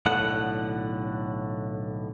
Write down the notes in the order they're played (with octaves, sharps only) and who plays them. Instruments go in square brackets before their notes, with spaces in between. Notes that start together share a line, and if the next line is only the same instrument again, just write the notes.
[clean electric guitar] B1 A2 D3 F#5